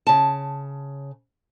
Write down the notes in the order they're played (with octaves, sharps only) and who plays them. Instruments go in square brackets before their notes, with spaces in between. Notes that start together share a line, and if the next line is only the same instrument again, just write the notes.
[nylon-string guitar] C#3 A5